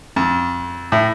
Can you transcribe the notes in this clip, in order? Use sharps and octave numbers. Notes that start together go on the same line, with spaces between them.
F2
A2